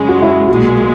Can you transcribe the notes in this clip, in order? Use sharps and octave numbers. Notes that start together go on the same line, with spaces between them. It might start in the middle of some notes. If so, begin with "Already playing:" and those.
Already playing: F#2 C#3 G#3 G#4
F#4
E4
B1 A#2 G#3 F#4